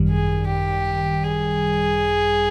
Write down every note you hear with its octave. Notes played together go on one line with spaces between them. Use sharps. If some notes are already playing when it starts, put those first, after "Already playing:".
Already playing: G#1 F#2 D#3 G3
G#4
G4
G#4